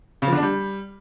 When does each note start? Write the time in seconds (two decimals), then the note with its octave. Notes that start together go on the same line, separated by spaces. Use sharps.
0.22 C#3
0.27 F3
0.32 D3
0.37 D4
0.42 G3